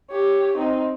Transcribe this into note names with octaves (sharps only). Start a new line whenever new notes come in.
G4 C#5
C4 D#4